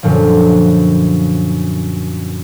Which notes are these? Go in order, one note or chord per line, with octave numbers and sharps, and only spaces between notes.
F#2 A#2 D3 F3